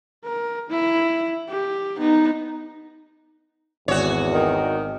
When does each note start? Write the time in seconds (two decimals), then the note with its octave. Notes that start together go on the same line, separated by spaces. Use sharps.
0.24 A#4
0.70 E4
1.49 G4
1.98 B3 D#4
3.88 G#1 E2 F#4 C#5 D5
4.31 D#3